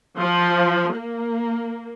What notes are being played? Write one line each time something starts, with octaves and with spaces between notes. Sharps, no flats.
F3
A#3